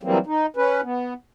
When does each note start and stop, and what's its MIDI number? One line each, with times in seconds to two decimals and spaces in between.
0.03 0.18 52
0.03 0.18 54
0.03 0.18 55
0.03 0.18 58
0.03 0.18 60
0.27 0.46 63
0.57 0.81 61
0.57 0.81 71
0.84 1.13 59